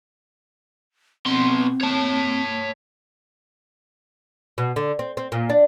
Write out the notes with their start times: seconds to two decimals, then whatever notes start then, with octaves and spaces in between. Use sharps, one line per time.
1.26 B2 C4 C6
1.81 C#5 A5
4.58 B2
4.76 D3
4.99 C4
5.17 C4
5.32 A#2
5.49 D4